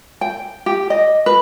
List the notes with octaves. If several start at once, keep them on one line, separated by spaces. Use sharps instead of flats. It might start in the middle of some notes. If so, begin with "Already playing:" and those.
G5
G4
D#5
B4